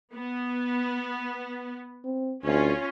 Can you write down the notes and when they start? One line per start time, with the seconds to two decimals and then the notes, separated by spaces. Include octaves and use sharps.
0.15 B3
2.04 C4
2.44 D2 C#4 F4